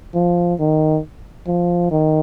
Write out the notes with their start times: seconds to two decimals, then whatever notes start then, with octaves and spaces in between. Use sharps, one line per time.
0.14 F3
0.60 D#3
1.47 F3
1.91 D#3